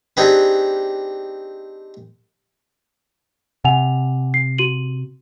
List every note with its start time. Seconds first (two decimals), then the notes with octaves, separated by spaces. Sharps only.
0.17 C4 D4 D#4 G4 G#4 B4
3.65 C3 F#5 G#5 F7
4.34 C7
4.58 F#4 D#7 F#7